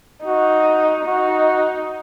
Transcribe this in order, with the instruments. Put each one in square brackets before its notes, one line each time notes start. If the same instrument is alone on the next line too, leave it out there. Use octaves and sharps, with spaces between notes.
[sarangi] D#4 [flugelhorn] F#4
[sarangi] D#4 [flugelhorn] F#4